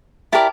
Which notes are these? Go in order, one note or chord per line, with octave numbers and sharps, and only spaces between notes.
E4 G4 A#4 D5 A5